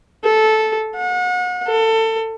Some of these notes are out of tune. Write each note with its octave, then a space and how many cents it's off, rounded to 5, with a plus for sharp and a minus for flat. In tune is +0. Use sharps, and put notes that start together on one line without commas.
A4 -10
F#5 -35
A4 +25